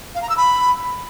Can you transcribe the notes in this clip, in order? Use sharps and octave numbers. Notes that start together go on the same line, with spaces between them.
F5
A#5
E6
B5